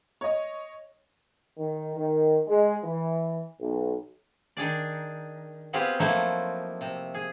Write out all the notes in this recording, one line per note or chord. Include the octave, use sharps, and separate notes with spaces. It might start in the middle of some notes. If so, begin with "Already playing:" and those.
C#5 D#5
D#3
D#3
G#3
E3
B1
D#3 D4 G#4 D5
B3 C4 F4 G4 G#4 B4
F3 F#3 A3 A#3 D#4 E4
C3
G#4